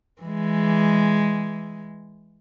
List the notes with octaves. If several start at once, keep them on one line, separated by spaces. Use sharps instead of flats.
E3 G#3